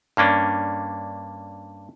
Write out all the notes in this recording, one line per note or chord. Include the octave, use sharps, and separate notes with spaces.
G2 A#3 C#4 D4